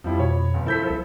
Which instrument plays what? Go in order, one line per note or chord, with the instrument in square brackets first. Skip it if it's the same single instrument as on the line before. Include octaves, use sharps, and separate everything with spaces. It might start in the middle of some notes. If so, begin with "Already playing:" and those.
[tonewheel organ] F2 [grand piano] F3 G3 E4
[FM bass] B2 [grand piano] C#5 B5
[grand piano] G1
[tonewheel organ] F3 A4 [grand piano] E4 G6 B6
[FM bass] C2